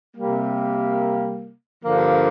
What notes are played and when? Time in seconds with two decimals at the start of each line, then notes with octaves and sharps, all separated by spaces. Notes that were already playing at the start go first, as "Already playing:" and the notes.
0.17 C3 G3 A#3
1.83 G2 D3 F3 A#3